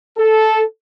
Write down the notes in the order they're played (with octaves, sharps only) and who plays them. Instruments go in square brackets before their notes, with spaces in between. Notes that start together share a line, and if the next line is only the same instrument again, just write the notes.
[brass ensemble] A4